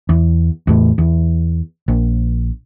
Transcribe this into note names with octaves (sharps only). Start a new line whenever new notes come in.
E2
E2 A2
E2
A#1